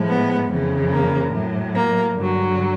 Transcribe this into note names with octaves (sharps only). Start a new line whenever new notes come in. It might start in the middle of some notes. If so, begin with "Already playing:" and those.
Already playing: A2 F3 G#3
B3
F2 C#3 E3
A#3
A2 F#3
A#3
G2 D3 F#3